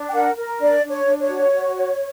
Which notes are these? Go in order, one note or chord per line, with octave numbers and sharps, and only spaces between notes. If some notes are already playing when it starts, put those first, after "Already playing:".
Already playing: D4
G5
A#4 F#5
A#4
D4 D5
D4
C#5
D4
C#5
F#4
F#4
C#5